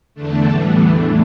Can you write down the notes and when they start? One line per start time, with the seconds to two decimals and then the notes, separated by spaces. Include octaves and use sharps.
0.14 E2 D3 A3 D4
0.47 A2 E3 G3 B3
0.78 E2 E3 A3 D4